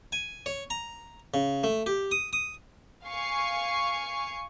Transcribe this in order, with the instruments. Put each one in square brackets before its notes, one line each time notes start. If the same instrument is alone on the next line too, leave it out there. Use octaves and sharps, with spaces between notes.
[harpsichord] G#5
C#5
A#5
C#3
A3
G4
D#6
D#6
[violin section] F5 G#5 C#6 C7